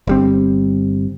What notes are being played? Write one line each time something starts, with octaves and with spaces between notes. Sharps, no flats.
G1 G3 C4